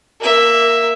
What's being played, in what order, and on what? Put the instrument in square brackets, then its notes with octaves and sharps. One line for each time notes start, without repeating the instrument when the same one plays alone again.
[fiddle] A#3 E5